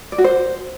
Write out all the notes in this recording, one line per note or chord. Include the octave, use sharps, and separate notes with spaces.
D5
F#4
C5